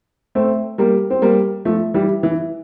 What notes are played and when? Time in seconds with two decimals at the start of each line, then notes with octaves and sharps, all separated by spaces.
0.35 A3 C4
0.78 G3 A#3
1.10 C4
1.22 G3 A#3
1.65 F3 A3
1.94 E3 G3
2.23 E3